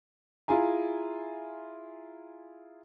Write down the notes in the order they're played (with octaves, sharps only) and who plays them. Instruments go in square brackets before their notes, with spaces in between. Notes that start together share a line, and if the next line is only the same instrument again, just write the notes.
[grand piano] E4 F4 G#4 G#5 A#5